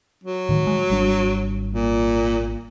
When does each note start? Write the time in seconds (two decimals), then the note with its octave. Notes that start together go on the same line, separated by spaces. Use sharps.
0.24 F#3
0.49 A2 D#3
0.67 G#3
0.89 G#1 G3 D4
1.73 A#2